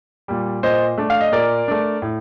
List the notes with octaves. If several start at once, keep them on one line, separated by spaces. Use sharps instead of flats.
A#2 G3
A#2 C5 D#5
A3 D4
F5
D#5
A#2 A#4 D5
A3 D4
A2